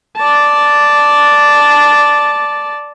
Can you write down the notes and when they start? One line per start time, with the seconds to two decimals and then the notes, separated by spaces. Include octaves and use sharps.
0.17 D5 A5